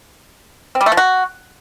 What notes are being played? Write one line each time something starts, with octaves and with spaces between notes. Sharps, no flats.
C4
G3
A3
F3
F#4